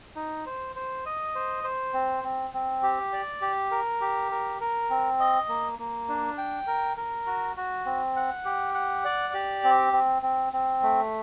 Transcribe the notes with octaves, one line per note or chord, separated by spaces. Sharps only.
D#4
C5
C5
D#5
C5
C5
C4
C4
C4
G4
D5
G4
A#4
G4
A#4
A#4
C4
D#5
A#3
A#3
D4
G5
A#4
A#4
F#4
F#4
C4
F#5
G4
F#5
D5
G4
C4
C4
C4
C4
A3